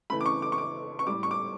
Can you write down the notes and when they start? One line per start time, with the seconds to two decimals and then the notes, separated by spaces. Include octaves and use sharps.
0.10 C#3 E3 A3 B5
0.21 D6
0.26 C#6
0.42 D6
0.52 C#6
0.58 D6
0.99 C#6
1.07 A2 G3 D6
1.23 C#6
1.31 D6